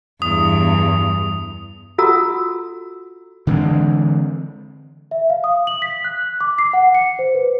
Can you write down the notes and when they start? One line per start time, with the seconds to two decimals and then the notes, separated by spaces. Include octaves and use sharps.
0.22 E2 G2 D#6
1.98 F4 F#4 A4 F#5 A#5 E6
3.47 D3 E3 G#3 C4
5.11 E5
5.30 F5
5.44 D#6
5.67 F#7
5.82 B6
6.04 F#6
6.41 D6
6.59 C7
6.73 F#5
6.95 C#7
7.19 C5
7.35 B4